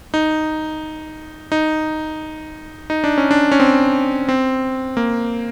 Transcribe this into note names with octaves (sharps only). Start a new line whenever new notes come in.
D#4
D#4
D#4
D4
C#4
D4
C#4
C4
C4
A#3